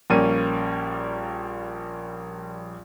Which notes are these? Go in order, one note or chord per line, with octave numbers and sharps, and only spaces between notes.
A#1 G3 A#3 C#4 D#7